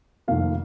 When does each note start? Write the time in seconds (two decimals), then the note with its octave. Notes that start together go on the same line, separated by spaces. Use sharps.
0.28 F1 F2 D#3 A#3 F5